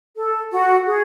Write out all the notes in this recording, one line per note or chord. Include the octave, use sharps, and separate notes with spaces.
A4
F#4
G#4